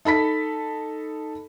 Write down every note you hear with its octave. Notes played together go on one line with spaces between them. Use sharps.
D#4 A4 B5 B6